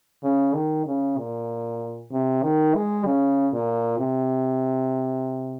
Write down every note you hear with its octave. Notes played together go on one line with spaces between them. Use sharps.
C#3
D#3
C#3
A#2
C3
D#3
G#3
C#3
A#2
C3